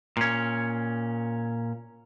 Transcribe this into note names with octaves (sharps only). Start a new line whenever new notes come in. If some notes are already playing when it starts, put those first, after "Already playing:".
A#2 C#4